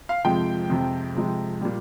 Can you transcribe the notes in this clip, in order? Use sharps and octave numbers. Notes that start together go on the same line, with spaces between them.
F5
F2 C3 F3 G#3 G5
F2 C3 F3 G#3
F2 C3 F3 G#3
A#2 G3